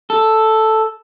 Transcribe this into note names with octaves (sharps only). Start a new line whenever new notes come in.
A4